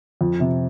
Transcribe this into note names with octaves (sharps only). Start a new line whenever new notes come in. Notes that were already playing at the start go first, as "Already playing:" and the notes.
F2
C3